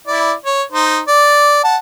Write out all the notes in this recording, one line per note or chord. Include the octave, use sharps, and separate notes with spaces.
E4 D5
C#5
D#4 C5
D5
F#5 A5